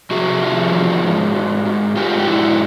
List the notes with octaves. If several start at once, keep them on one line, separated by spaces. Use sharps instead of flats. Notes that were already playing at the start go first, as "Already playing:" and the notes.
C3 F#4 G#4
F3
E2
G#2
G#2
G#2
G#2 F4 G4
G4
G#2 E4 F#4